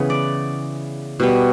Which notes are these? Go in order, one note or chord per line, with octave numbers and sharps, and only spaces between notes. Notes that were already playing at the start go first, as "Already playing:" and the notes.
Already playing: C#3 E3 B3 B4
D5
B2 G3 B3